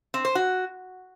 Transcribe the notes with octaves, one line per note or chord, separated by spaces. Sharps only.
C4
C5
F#4